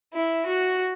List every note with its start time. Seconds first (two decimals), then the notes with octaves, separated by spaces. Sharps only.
0.14 E4
0.46 F#4